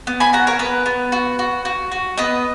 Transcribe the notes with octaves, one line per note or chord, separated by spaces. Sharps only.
B3
G#5 B5
F#4 F#5 A#5
A#4 C#5
B3 B4
B3
F#4
F#4
F#4
F#4
B3 B4 D#5